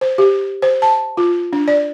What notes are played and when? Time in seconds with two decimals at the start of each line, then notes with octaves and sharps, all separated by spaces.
0.01 C5
0.18 G4
0.62 C5
0.82 A5
1.17 F4
1.53 D4
1.68 D5